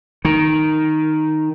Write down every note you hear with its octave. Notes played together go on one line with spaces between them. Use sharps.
D#3